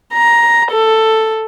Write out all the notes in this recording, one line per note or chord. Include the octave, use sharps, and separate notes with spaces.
A#5
A4